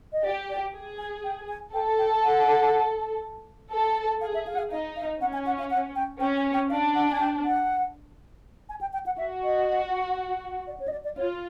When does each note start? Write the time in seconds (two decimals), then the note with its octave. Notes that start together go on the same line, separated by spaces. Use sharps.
0.13 D#5
0.24 G4 D5
0.50 D5
0.74 G#4
0.98 G#5
1.24 G5
1.49 G#5
1.74 A4 G5
1.99 G5
2.24 F#5
3.72 A4
4.21 G#4 F5
4.34 E5
4.47 F5
4.55 F#5
4.58 F5
4.71 D#4 F5
4.96 F5
5.20 C#4 F#5
5.33 G#5
5.46 F#5
5.59 F5
5.70 F#5
5.96 G5
6.20 C#4 G5
6.37 G#5
6.54 G5
6.70 D4 F5
6.95 F#5
7.11 G#5
7.20 G5
7.44 F#5
8.69 G#5
8.81 G5
8.93 G5
9.06 F#5
9.18 F#4 E5
9.44 D#5
10.67 D5
10.80 C#5
10.88 D#5
10.92 D5
11.04 D5
11.17 F4 C#5